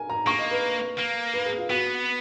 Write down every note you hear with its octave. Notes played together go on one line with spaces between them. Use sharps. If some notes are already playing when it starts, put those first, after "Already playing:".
Already playing: A#4 G#5
A#5
A#3 C#6
D#5
B4
A#3
B4
G#4
F4
B3 F#4